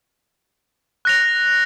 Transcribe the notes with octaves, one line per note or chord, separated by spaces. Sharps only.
F#6 A#6 F7